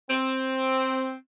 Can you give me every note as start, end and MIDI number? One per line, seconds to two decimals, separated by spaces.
0.11 1.14 60